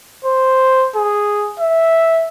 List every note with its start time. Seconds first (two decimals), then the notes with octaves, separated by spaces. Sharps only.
0.25 C5
0.96 G#4
1.60 E5